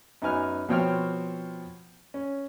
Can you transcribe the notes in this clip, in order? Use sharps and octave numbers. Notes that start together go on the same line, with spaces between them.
F#2 B3 D#4 G#5 F6
B2 F3 C4 C#5 G5 F6
C#4